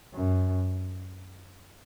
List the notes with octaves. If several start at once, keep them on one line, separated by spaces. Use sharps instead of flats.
F#2